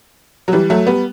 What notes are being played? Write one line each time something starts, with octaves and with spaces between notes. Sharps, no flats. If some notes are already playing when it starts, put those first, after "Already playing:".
F#3
E3 G3
F#3 A3
G3 B3